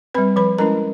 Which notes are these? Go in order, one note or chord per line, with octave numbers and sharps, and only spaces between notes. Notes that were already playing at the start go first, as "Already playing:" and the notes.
G3 C4 B4 B5
F3 B4 B5
G#3 C#4 E4 A#4 A#5